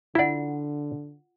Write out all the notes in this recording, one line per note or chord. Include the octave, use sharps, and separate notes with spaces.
D3 E4 F4 D5 F#5